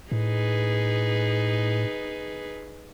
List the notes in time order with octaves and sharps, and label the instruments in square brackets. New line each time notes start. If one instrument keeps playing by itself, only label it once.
[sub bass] A2 [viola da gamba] D#4 G#4 B4